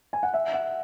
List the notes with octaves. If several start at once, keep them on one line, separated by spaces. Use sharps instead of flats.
G#5
F#5
E5
F#5